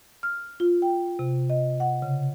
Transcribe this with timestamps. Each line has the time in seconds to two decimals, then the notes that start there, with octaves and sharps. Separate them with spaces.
0.23 F6
0.60 F4
0.82 G5
1.19 C3
1.50 D#5
1.80 F#5
2.02 C#3